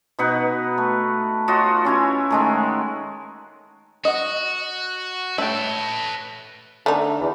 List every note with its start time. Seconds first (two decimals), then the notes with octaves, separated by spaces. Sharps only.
0.19 B2 D#4 B4 F#5
0.78 A3
1.48 F4 F#4 C#5 D#5
1.85 C#4 E4 G#5
2.30 D#3 G#3 A3
4.05 F#4 D#5 F#5
5.38 A3 B4 C#5 G5 A5
6.86 D3 A3 D#4
7.20 E2